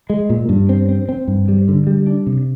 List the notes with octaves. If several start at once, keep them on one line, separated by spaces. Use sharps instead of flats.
G#3
A#2
G2
C4
C4
C4
G2
G3
D3
G3
D4
C3